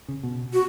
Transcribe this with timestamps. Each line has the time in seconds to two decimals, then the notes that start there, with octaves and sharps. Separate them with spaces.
0.08 C#3
0.23 B2
0.53 F#4